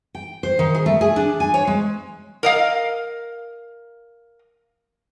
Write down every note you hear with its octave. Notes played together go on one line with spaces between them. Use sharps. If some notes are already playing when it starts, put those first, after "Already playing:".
G5
C5
D#3
G#4
A3
G#4
D4
G#5
C#5
G#3
A#4 D#5 F5